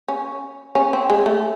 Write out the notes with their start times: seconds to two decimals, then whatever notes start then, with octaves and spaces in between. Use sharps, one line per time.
0.08 C#4
0.75 C#4
0.93 C4
1.10 G#3
1.26 A3